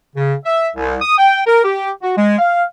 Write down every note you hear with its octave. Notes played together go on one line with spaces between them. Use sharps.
C#3
E5
C2
D#6
G5
A#4
G4
F#4
G#3
F5